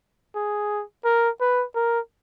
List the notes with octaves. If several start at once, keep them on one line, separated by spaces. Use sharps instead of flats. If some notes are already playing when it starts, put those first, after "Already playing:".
G#4
A#4
B4
A#4